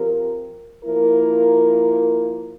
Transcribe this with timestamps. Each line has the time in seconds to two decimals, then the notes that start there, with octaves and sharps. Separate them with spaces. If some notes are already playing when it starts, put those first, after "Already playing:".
Already playing: F3 C4 G4 A#4
0.84 F3 A#3 E4 A#4